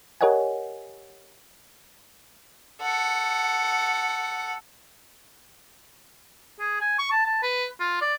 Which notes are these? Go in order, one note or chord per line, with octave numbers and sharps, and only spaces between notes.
G4 A#4 C#5 D#5 F#5 G#5
A4 F#5
G#4
G#5
C#6
A5
A5
B4
F4
D5